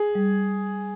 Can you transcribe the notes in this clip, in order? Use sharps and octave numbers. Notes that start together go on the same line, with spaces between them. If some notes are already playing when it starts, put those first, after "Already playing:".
Already playing: G#4
G3